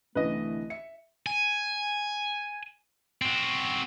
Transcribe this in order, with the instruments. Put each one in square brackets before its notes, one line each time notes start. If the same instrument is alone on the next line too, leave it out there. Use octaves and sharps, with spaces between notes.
[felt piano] C2 D3 E3 [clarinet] A3 [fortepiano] B4 D#5
[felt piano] E5 C#7
[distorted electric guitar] G#5
C4 F#4